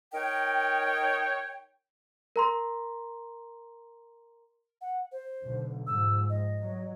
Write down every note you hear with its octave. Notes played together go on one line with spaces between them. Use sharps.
D#4 A#4 C#5 G5
A#4 A#5 C6
F#5
C5
B1 D3
G#2 F3 E6
D#5
F#3